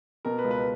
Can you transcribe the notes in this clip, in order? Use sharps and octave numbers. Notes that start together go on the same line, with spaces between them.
B2 A#4
B4
C#2
B4